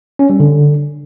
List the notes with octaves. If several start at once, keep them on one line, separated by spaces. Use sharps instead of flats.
C#4
G3
D3